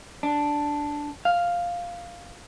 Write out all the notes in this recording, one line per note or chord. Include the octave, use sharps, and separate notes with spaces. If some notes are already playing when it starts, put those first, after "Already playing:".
D4
F5